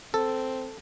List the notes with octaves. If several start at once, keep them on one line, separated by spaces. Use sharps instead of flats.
C4 A4